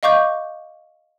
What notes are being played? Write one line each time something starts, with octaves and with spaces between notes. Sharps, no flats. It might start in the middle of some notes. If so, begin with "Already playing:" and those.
D#5 F5 C#6 D6 G6